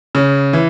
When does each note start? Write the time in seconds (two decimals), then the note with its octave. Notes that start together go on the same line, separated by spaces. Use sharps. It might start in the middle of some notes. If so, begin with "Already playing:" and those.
0.15 C#3
0.53 E3